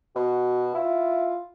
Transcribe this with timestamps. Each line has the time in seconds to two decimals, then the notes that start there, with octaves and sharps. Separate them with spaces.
0.16 B2 F#4
0.75 E4 F4